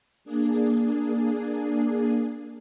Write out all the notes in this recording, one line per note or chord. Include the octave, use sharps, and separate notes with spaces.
A#3 D4 G#4